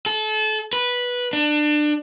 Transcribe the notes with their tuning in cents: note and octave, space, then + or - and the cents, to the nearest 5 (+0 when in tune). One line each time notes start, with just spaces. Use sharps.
A4 -30
B4 -10
D4 +25